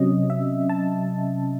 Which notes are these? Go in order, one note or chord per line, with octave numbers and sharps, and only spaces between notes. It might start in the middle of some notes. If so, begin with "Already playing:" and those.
Already playing: C3 F#3 C#4 D#5
E5
A5